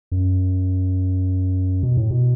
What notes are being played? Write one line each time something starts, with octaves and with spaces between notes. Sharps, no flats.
F#2
B2
A2
B2